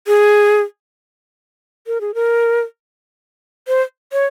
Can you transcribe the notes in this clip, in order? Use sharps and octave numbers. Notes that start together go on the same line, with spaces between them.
G#4
A#4
G#4
A#4
C5
C#5